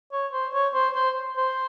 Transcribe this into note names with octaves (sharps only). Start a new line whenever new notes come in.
C#5
C5
C#5
C5
C5
C5